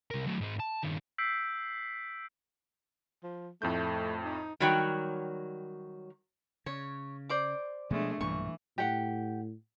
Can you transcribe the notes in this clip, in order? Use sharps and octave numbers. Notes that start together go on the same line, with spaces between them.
C2 A#4
F#3 A3
G#2 C4
A5
G2 D#3
E6 G6 B6 C7 D7
F3
F2 A2 A3 G6
D#4
D#3 F#3 G3 F#4 C#5 G5
C#3 C#5
C5 D5 D6
B2 F3 G#3 A3 B3 D4
B1 G2 A#2 E3 C#6
A2 G4 F#5